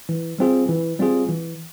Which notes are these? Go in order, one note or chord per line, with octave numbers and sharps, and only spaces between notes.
E3
G3 C4 F4 G#4
E3
G3 C4 F4 G#4
E3